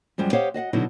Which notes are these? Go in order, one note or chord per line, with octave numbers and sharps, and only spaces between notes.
F#2 F3 G3 G#3
G4 C5 C#5 D#5 F5 F#5
F#4 D#5 F5 F#5
B2 D3 F#3 D#4 E4